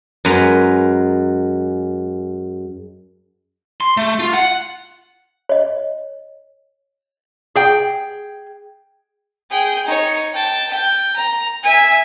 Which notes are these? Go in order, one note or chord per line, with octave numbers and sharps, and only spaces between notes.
F#2 G#3 B4 A#5
C6
A3
F4
F#5
C#5 D#5
G#4 G5
G#4 G5
D#4 C#5
G5 A5
G5
A#5
E5 G#5